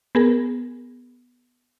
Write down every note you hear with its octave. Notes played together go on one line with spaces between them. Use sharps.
B3 G#4 A#4